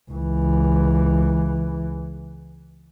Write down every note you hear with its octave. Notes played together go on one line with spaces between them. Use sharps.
C#2 E3